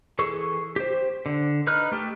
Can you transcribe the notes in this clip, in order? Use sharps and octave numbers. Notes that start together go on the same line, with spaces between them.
E3 G#4 A4 C#6
G4 C5
D3
D#4 B4 F6 F#6
A3 G4 A4